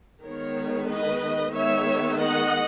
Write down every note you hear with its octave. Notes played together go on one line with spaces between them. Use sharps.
D#3 G#3 B3 A#4 C#5
B4 D#5
D#3 G#3 B3 C#5 E5
D#5 F#5